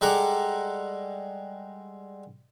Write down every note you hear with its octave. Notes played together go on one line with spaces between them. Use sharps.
G3 G#3 A4 F#5 A#5 D6